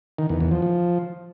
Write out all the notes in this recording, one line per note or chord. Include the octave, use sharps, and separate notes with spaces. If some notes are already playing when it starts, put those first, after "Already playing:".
D#3
E2
E2
F3
F3